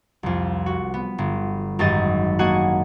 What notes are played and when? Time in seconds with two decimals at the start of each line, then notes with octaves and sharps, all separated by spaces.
0.23 C2 F2
0.66 F#4
0.94 B3
1.18 G1
1.79 G#1 F#2 D#4 G4 D#5 A6
2.39 A#3 D4 F#4 D#5 F#5 G#5